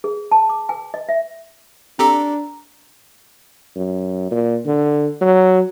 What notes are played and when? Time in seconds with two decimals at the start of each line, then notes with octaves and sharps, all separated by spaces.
0.04 G#4
0.31 A5
0.49 D6
0.69 G#5
0.94 D#5
1.09 E5
1.99 C4 D4 G4 A4 A#5
3.76 F#2
4.31 A#2
4.65 D3
5.21 F#3